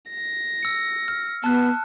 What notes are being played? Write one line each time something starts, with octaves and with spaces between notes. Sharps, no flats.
A#6
E6 C#7
F6
B3 A5 F#6